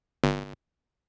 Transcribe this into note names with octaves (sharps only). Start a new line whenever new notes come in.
G1